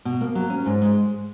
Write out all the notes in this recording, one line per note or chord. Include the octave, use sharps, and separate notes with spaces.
B2
A#3
F#3
C#4
G#2
G#3